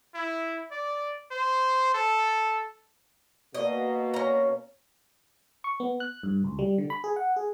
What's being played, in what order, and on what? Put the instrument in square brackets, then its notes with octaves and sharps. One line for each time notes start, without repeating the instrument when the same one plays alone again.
[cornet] E4
D5
C5
A4
[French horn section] B2 A#3 [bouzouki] D#5
[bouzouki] C#4 A#5
[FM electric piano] C#6
B3
F#6
G2
C#2
G3
D3
B5
G#4
F#5
G#4